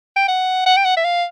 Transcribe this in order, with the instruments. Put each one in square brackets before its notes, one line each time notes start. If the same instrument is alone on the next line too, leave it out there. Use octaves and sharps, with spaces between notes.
[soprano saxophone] G5
F#5
F#5
G5
F#5
E5
F5